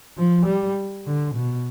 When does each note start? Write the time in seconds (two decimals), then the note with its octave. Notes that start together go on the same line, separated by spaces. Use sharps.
0.17 F3
0.46 G3
1.06 D3
1.35 B2